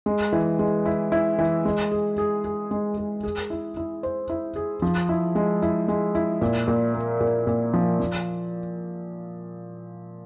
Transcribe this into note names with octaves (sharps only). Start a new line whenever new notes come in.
G#3
E3
G#3
E4
E4
E3
G#3
G#4
G#4
G#4
G#3
G#4
G#4
E4
E4
C5
E4
G#4
F3
E4
G#3
E4
G#3
E4
A#2
A#2
A#3
A#2
A#2
F3
F3